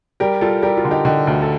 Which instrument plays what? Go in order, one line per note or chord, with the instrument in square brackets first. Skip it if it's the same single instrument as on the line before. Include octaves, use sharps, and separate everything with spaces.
[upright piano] G3 G4 A#4
G3 F4 A4
G3 G4 A#4
F4
D3
D#4 G4
D3 D#4 G4
D2
A4